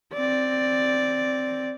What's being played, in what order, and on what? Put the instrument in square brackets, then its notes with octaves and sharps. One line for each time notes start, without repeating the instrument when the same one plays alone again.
[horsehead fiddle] C4 D5